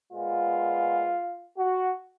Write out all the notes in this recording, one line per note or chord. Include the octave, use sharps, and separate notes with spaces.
A#2 G#3 B3 F4
F#4